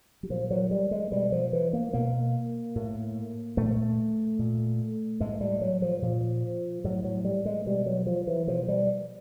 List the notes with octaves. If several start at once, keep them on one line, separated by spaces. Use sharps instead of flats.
F#3
A#2 F3
F#3
G3
G#3
B2 G3
F3
E3
A#3
B2 A#3
A2
A#2 A3
A#2
A2 G#3
G3
F#3
F3
A#2 F3
A2 F#3
F#3
G3
G#3
B2 G3
F#3
F3
E3
B2 F3
G3